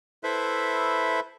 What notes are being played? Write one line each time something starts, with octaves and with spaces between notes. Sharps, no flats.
E4 A4 B4 C5 E5